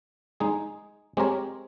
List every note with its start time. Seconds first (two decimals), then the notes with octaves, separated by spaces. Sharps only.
0.40 G#3 D#4 G#4
1.17 G#3 C4 G4 A#4 C#5